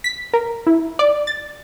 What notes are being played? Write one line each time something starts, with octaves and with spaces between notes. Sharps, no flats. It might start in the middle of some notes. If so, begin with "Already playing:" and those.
B6
A#4
E4
D5
A6